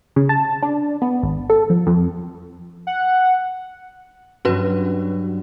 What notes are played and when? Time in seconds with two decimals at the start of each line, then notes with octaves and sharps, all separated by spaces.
0.16 C#3
0.29 A5
0.63 D4
1.02 B3
1.23 G#1
1.50 A4
1.70 F3
1.87 F2
2.87 F#5
4.45 G2 F#3 C#4 F#4 B4